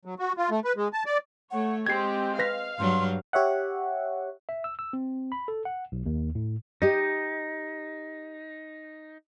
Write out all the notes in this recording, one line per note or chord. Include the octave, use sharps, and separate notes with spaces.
F#3
F#4
F4
A3
B4
G#3
A5
D5
A3 C#5 F#5
G#3 C4 G4 D#5 G#6 C7
B4 F5 A#6 B6
G2 F#3 C6
G4 C#5 E5 F#5
E5
E6
E6
C4
B5
A4
F#5
B1
D#2
A2
D#4 G4 D#5